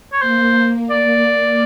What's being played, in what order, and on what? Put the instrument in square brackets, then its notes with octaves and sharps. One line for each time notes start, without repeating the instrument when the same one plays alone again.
[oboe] C#5
[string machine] A#3 [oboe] C5
[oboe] D5